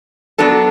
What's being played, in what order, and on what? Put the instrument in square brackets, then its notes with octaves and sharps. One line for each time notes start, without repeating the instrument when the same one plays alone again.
[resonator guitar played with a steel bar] F#3 B3 D4 A4